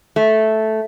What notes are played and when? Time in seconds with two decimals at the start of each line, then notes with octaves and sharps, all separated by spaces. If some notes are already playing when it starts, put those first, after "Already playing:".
0.16 A3